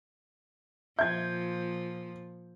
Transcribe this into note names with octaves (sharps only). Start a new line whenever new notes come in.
A#2 F3 E5 G6 G#6